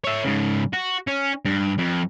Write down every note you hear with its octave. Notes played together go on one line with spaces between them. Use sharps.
C#5 E5
G#2 C#3
F#4
C#4
G2
F2